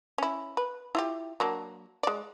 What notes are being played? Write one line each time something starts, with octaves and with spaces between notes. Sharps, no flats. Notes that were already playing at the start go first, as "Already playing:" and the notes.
C#4 E4
B4
E4 F4 G4
F#3 A#3 D4
G#3 D5